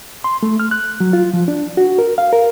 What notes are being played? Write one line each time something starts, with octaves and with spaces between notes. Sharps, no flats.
C6
A3
F6
F#6
F#3
F4
F3
D4
F#4
A#4
F5
A#4